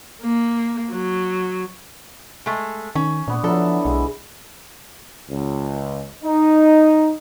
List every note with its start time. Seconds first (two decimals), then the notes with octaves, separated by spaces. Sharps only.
0.22 A#3
0.91 F#3
2.46 G#3 A3
2.95 D#3 C#4
3.28 A#2 B3 D4
3.44 D3 F3 F#3 E4 A4
3.85 B1 G#3
5.30 C#2
6.24 D#4